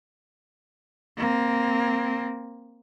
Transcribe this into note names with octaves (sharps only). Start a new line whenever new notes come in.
A#3 C4